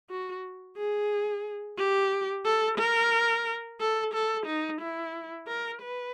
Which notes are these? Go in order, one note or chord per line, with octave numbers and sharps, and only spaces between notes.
F#4
G#4
G4
A4
A#4
A4
A4
D#4
E4
A#4
B4